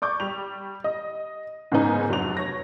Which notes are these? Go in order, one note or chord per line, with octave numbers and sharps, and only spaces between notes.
D5 C#6 D6 G6
G3 G4 F7
D#5
G#2 C#3 A#3 B3 D#4 G#5
F1 F#3 D4 F#4 F7
C#5 A#6